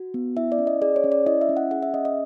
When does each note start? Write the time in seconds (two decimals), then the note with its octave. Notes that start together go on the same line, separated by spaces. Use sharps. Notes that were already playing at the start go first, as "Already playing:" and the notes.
Already playing: F#4
0.14 B3
0.37 E4 E5
0.52 D5
0.58 C#4
0.67 D#5
0.82 G#4 D5
0.96 C#5
1.04 C#4
1.12 D5
1.26 E4 D#5
1.41 E5
1.49 C#4
1.57 F#5
1.71 G#4 F#5
1.82 E5
1.94 C#4 D#5
2.05 D#5